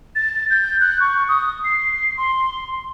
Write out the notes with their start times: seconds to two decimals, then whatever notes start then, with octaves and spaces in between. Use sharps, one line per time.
0.15 A6
0.50 G6
0.81 F#6
1.00 C#6
1.28 D#6
1.64 C7
2.17 C6